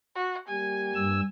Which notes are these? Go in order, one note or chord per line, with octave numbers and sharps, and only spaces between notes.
F#4
G3 A#3 G4 G#5
G2 E6